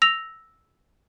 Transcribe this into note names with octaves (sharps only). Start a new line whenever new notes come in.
E6 A#6 F7